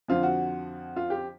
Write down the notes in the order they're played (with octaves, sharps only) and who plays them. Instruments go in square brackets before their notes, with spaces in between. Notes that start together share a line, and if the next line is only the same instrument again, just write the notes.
[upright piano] F2 D3 F3 F4
F#4
F4
G4